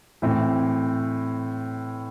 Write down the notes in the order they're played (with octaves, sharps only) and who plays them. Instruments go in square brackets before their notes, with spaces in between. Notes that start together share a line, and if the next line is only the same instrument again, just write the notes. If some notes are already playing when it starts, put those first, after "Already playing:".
[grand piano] A2 E3 A3 C4 E4